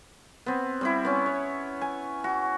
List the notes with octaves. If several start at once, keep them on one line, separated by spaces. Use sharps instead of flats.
B3 C4
G3 C4 E4
B3 C#4
C#5
G#5
F#4